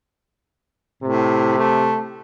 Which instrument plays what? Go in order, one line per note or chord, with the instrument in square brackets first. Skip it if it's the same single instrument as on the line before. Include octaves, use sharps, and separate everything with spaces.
[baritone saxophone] A2 [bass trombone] C3
[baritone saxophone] A3